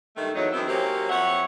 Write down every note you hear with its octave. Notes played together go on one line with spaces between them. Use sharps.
G2 D#3 G#3 A3
E2 F#3 D#4
F#2 D#3 E3 B3 C4 E5
F#3 A#3 C4 C#4 G4
F2 C#5 E5 F#5